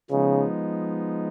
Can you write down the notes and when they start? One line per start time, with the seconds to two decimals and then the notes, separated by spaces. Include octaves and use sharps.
0.10 C#3 F3 G#3 B3 D#4